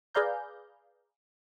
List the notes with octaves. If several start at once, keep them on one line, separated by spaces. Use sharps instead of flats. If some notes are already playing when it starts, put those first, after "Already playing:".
G#4 B4 D5 F5 A#5 G6